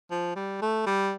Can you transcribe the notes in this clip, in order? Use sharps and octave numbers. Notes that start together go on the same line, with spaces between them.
F3
G3
A3
G3